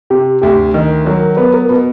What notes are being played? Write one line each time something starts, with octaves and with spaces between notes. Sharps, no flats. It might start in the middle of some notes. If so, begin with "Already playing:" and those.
C3 G4
D2 G4
D#3
F#3 A#4
B3 B4
A#4
B2 B4